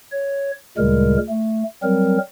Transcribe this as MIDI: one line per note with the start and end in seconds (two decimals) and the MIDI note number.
0.12 0.51 73
0.77 1.17 38
0.77 1.17 46
0.77 1.17 49
0.77 1.17 55
0.77 1.17 56
0.77 1.17 70
1.29 1.63 57
1.83 2.18 54
1.83 2.18 55
1.83 2.18 60
1.83 2.18 70